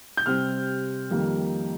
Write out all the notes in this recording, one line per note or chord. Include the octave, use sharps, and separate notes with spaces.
G6
C3 G3 C4 F6
F2 D#3 G3 A#3